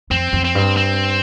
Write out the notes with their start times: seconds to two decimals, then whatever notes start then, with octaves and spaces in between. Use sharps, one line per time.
0.10 F2 C4
0.33 F2
0.45 C4
0.55 G2
0.77 C4